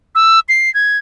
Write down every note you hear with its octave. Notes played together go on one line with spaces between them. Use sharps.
E6
C7
G#6